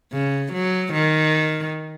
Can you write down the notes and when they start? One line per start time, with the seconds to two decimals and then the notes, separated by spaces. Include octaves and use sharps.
0.12 C#3
0.52 F#3
0.93 D#3